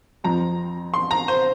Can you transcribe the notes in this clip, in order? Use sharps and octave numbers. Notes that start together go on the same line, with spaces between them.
F2 F3 C4 A#5
C6
A#5
C5